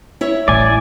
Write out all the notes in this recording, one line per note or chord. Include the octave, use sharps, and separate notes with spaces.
E4 C#5 E5
A1 D5 G#5